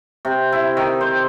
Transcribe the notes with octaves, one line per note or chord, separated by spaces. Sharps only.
C3
E4
D#3
C5